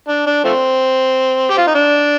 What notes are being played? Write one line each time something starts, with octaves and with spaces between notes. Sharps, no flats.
D4
D4
F3 A3 C4
G4
F4
D#4
D4